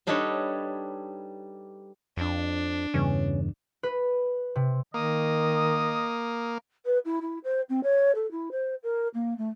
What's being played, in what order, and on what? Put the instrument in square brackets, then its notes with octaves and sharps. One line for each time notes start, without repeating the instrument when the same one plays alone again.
[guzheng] G3 D4 D#4 A4 B4 C#5
[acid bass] F2 [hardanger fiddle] D4
[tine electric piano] E2 G2 E3 [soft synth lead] C#3 [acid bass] C#4
[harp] B4
C3
[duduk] D#3 [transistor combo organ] A#3 [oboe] D#5 [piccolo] D#6
[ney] B4
E4
E4
C5
C4
C#5
A4
E4
C5
A#4
A#3
A3